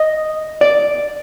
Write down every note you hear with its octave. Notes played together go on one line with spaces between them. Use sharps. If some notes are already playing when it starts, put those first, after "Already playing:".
Already playing: D#5
D5